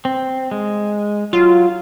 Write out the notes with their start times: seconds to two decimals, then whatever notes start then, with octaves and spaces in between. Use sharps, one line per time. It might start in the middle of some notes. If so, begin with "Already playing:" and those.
0.05 C4
0.51 G#3
1.33 F#3 F4